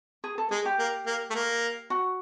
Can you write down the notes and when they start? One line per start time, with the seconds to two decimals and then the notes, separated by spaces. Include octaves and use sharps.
0.24 G#4
0.38 A4
0.51 G#3 G#4
0.65 G4
0.79 A#3
1.07 A#3
1.30 A3
1.35 A#3
1.90 F#4